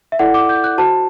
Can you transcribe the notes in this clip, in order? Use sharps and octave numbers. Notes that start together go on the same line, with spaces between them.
E5
E4 A4 D5 F#5
D6
G6
F#6
F#4 C5 A5